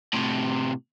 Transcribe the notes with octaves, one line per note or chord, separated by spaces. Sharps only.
A2 C3